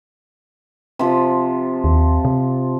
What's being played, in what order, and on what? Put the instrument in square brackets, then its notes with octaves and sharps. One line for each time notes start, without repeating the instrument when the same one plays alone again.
[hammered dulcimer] C3 F3
[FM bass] D#2
C3